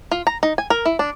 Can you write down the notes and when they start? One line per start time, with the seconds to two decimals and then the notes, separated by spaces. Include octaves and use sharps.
0.12 F4
0.27 A#5
0.43 D#4
0.58 G#5
0.70 A#4
0.86 E4
0.99 D4